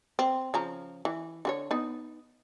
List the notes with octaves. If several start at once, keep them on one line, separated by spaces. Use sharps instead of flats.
C4
C#3 F3 A#5
E3
D3 F#4 C#5
B3 D#4